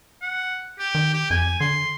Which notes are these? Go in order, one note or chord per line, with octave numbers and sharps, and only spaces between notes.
F#5
G4
D#3
G4
F2 G#5
D3 C6